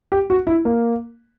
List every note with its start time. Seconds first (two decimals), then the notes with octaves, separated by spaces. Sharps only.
0.12 G4
0.30 F#4
0.47 E4
0.65 A#3